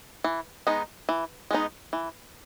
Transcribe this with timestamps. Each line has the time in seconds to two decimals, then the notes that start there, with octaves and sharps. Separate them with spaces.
0.24 E3
0.67 G#3 B3 D#4
1.09 E3
1.51 G#3 B3 D#4
1.93 E3